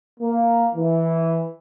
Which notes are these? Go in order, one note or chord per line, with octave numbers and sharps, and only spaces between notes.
A#3
E3